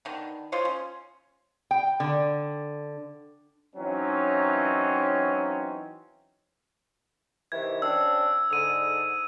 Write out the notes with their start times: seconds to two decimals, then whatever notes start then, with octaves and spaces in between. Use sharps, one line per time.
0.05 D3 D#3 B3
0.52 F4 C5 C#5 D#5
0.65 C#4
1.71 G5
2.00 D3
3.76 E3 F#3 C4 C#4 D#4
7.52 C3 D#3 E3 G#6
7.82 C#3 C4 D4 E6
8.50 G#2 D3 D#6 D#7